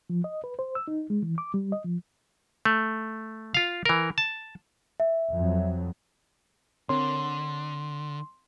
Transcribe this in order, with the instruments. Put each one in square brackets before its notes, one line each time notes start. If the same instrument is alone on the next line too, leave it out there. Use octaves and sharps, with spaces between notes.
[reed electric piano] F3
D#5
B4
C5
E6
D#4
G#3
E3
D6
G3
D#5
F3
[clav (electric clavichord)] A3
F4 F5
E3 A#4
A5
[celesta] E5
[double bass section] F2 F#3
[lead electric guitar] D3 [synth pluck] C4 A#4 C#5 [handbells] C6